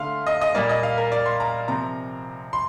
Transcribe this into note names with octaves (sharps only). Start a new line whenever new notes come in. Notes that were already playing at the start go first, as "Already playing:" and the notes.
Already playing: D3 A3 F5 C6
D#5
D#5
A#2 G3 A#3 D5
D#5
F5
A#4
D5
C6
A#5
C3 F3 C4 A#5
C6